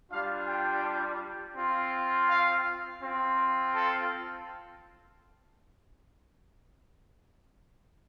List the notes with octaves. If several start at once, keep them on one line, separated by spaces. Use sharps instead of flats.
G3 D4 F4 F5
G5
C4 F4
F5
C4 F4
A4